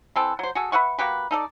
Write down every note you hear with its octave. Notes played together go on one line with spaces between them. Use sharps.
E3 C4 A4
F#3 C5
F#4 G#4 A4
B4 E5 F#5 C#6
A#3 F#4 G4 B4
D#4 A4 D5